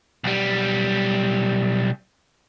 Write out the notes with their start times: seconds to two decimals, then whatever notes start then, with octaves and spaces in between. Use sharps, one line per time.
0.24 B1 G3